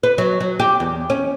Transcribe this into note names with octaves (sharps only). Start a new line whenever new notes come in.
B4
F#3
F#3
G4
E2
C#4